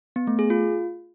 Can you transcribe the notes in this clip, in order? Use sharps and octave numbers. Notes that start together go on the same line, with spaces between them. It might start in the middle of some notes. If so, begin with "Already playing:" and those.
B3
A3
G#4
F4